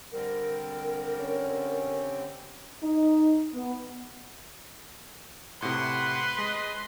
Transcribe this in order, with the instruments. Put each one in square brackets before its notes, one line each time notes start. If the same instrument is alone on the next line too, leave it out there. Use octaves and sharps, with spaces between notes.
[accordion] D3 G3 C4 [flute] A#4
[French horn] C#4
[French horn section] D#4
B3
[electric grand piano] A2 C3 [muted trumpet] B4 [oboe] F#5 [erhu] C6
[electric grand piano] G#3 [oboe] D#5